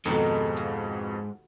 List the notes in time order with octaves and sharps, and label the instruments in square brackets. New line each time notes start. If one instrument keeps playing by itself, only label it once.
[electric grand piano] F2 B2 [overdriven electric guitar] G#2 [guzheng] D#3 [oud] G4 A4
[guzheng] F4 F#4